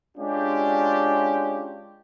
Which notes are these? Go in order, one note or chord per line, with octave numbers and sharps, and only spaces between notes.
G#3 C#4 D4 F4 G4